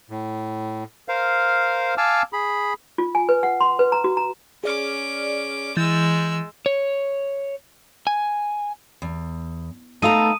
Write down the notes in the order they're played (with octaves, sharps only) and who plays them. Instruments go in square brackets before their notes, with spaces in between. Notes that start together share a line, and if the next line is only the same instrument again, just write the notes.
[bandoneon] A2
A#4 C5 F5
F5 G#5 A5 D6 E6 F6
G#4 B5
[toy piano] F4
G#5
B4
F#5
C6
B4
A#5
F#4
A#5
[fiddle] C#4 D6 [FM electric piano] G#4 D5 F6
[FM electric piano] E3 G6 A6 [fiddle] G#3 E6
[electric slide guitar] C#5
G#5
[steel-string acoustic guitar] E2
[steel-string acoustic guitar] A3 B3 [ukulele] D#4 F5 A#5 [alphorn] A4 [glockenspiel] D#6 D#7